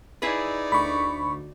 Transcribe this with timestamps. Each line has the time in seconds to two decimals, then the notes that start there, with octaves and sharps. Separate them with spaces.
0.22 D#4 E4 G#4 B4 D5
0.72 D2 B5 C#6